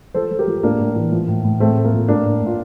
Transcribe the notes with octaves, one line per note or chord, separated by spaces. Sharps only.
F3 A4 C5
F3
G4 A#4
F3
A2 A#3 D4
A2
E3
F3
A2
A2
A2 A3 C4
A2
A#3
F3
A2 A#3 D4
A2
A2 F4